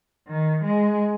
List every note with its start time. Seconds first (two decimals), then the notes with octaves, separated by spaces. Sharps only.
0.28 D#3
0.64 G#3